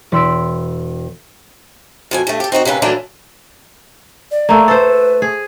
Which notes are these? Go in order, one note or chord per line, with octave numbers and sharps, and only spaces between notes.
E1 B5 C6 E6 B6 D7
F2 B2 G#5
G2 A3
G4 A4
C4 D#4 F#4 D#5
C3 A#3 C#4 B4
E3 F#3 A3 A#3 D4 F4
D5
A3 A#3
A4 B4 C5
G#4